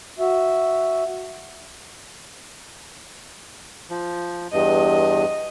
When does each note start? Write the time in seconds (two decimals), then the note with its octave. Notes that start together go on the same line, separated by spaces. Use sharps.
0.19 F#4 E5
3.90 F3
4.52 E2 G2 D#5